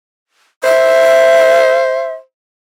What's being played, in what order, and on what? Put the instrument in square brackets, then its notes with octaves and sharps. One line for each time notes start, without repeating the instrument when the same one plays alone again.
[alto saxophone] C5 [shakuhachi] E5